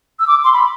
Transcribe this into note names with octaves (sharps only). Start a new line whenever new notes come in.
E6
D6
C6
B5